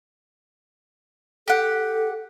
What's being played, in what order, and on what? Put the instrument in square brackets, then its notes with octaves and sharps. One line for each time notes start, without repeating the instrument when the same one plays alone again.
[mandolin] G4 F#5 [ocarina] A4